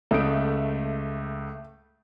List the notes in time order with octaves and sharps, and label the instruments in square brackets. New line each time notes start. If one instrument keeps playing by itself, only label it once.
[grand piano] C#2 D#6 D7 [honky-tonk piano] A3